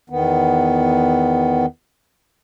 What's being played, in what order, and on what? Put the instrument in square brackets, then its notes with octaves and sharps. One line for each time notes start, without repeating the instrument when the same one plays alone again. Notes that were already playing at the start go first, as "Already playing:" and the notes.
[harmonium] E2 D#3 B3